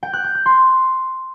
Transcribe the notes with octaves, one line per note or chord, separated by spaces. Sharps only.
G5
F#6
G6
F#6
C6